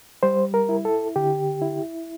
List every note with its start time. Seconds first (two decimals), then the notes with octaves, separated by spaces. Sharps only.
0.23 G3 C5
0.54 A#4
0.69 E4
0.85 A4
1.16 D3 G4
1.62 E4